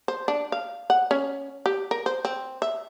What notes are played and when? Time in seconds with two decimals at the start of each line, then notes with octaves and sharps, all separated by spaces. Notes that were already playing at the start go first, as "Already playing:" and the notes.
0.08 C5
0.28 D4
0.52 F5
0.90 F#5
1.11 C#4
1.66 G4
1.91 A#4
2.06 C5
2.25 C4
2.62 E5